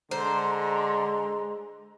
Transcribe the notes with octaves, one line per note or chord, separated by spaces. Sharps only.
D3 G#3 C5 A#5 C6